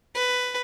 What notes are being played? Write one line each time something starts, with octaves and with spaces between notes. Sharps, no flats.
B4